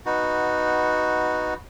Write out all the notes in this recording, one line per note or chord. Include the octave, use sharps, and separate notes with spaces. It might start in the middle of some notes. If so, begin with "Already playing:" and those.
B3 D#4 F#4